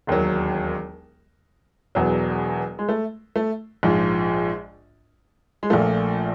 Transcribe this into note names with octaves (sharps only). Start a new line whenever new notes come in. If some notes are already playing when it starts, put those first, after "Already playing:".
E1 D#2 D#3 F#3
E1 E2 B2 F#3
G#3
A3
A3
A#1 G#2 F3
G#3
A#1 A#2 F3 A3